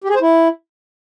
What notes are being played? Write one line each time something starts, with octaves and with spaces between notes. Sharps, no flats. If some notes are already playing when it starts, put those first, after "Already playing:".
G4
G#4
C5
E4